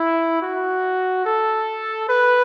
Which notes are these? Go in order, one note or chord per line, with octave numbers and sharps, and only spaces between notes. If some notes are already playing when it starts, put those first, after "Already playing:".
Already playing: E4
F#4
A4
B4